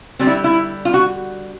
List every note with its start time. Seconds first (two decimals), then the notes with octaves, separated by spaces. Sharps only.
0.19 D3 G3 C4
0.27 E4
0.44 E4
0.85 F4
0.94 F#4